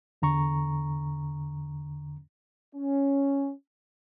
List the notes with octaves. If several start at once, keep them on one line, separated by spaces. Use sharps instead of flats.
E2 D3 A#5 C#6
C#4